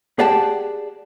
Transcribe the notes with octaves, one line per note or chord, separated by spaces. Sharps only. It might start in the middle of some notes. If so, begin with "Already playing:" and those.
G4 G#4 D5 F#5 G5 A5